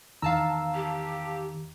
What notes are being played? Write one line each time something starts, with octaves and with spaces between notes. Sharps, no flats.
E2 D#3 F5 A5 A#5 E6
G4